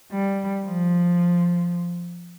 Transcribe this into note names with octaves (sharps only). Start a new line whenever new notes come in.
G3
F3